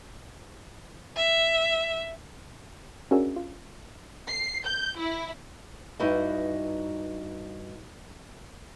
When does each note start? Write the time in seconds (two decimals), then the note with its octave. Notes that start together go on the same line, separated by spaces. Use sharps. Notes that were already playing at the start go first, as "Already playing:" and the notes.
1.16 E5
3.11 C#4 D4 F#4 G#4 A#4 E5
3.36 F4
4.27 C7
4.65 G6
4.97 E4
6.00 G2 D#4 E4 F#4 B4 D#5